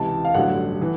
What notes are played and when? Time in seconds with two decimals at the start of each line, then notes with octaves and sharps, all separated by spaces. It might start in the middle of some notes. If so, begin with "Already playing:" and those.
Already playing: C#2 C3 E3 A5
0.25 F5
0.34 A1 G2 D3 F#3 F#5
0.82 E3